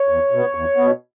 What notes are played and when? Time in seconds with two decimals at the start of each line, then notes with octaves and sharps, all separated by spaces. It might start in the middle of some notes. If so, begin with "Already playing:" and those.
Already playing: C#5
0.09 E2
0.31 B2 B3
0.55 E2
0.77 B2 B3